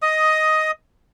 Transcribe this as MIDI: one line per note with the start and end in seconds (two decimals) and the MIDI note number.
0.02 0.71 75
0.02 0.71 87